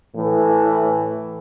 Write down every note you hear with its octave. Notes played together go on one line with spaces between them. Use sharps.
A2 E3